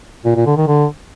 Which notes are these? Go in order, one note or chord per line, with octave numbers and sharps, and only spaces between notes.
A#2
A#2
D3
D#3
D3